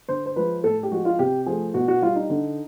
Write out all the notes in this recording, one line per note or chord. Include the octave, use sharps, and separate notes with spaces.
D3 C5
C5
F3 G#3 B4
A2 A4
G4
F3 G#3 F#4
F4
C3 G4
F3 A3 G#4
B2 F#4
F#4
G3 F4
D#4
D3